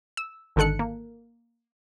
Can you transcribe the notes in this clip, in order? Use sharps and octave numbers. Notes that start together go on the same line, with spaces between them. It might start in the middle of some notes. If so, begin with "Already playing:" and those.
E6
G#1 D3 D#3 A4 F#6 C#7
A#3